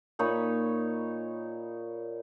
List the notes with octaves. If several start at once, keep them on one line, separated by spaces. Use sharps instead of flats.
A#2 D#4 C#5 B5